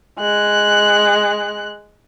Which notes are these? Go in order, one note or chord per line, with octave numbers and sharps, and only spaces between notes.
G#3 F#6